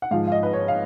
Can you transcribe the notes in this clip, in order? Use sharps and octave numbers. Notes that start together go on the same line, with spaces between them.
F#5
G#2 F3 F5
F5
D#5
B4
C#5
F5